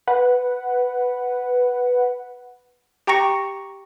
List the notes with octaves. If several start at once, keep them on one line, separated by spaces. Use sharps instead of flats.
B4 F#5
G4 G5 A#5 C#6 A#6 C#7